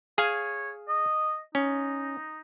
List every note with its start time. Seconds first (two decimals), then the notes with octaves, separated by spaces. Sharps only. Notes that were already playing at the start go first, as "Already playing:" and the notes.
0.18 G#4 C#5 F5 G#5
0.88 D#5
1.55 C#4 D#4